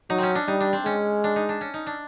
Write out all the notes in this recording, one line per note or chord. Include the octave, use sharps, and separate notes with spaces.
F#3 D#4
C4 C#4
D4
G3 D#4
D4
C4
G#3 C#4
D4
D#4
D4
C#4
D#4
D4